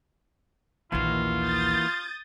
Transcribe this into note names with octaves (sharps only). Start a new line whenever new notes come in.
A#1 D#2 E3 A#3 F4 F#4
D#6 G6 A6